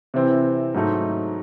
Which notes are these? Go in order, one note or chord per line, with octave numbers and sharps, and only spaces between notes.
C3 E3 C4
G#2 F#3 A3 D#4